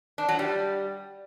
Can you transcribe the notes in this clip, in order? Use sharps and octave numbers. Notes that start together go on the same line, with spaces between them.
D4
F#3
G3